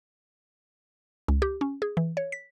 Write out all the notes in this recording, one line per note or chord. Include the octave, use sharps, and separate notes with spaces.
C#2
G4
C#4
G#4
E3
C#5
B6